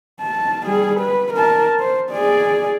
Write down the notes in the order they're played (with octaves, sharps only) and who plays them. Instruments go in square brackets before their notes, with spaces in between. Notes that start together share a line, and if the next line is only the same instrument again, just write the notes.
[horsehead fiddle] A5
G3 G#4
B4
A#4 A5
C5
G#4 D5